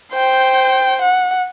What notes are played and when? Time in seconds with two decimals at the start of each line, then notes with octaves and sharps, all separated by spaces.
0.13 C5 G5
1.01 F#5